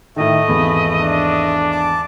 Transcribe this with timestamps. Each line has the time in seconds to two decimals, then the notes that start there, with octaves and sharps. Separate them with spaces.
0.16 A2 D#3 A3 D#5
0.48 G#1 E2 B5
0.98 D4
1.72 A5 D6